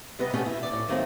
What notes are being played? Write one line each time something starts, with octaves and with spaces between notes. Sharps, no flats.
C3 G3 B3 B4 D#5
B2 A3 B3 C#4 G4 G#4
E4
D2 D5
A2
D#3 F#3 A3 A#3 C4